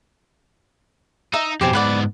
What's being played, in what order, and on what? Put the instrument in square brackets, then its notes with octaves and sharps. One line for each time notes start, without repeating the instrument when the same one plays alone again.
[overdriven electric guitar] D#4 [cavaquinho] D#5 E5 A#5
[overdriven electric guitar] F2 B2 [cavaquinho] G4 C5 G#5
[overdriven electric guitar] G#2 B3 [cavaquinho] D5 F#5 B5